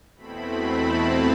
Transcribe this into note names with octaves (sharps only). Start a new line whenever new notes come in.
E2 B2 A3 C4 E4 B5
A5
F5